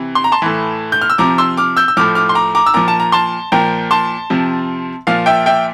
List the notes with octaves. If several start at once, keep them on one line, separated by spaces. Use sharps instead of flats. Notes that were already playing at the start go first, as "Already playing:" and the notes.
Already playing: C3 E3
C6
A#5
A5 C6
A2 E3
G6
F6
E6
C3 F3 A#5 D6
C6 E6
D6 F6
E6 G6
E6
A2 F3 D6 F6
D6 F6
C6
A#5 D6
A#5 D6
E6
A#2 F3 A#5 D6
A5
A#5
A5 C6
A#2 F3 G5 A#5
A5 C6
C3 F3
A#2 F3 F5
E5 G5
E5 G5